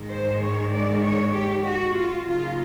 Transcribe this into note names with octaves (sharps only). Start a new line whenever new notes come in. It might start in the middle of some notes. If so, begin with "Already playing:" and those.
Already playing: G#2 D#3 G#3
C5
C#5
D5
C#5
G4
F#4
F4
C#3 F#3 A#3 D#4 F4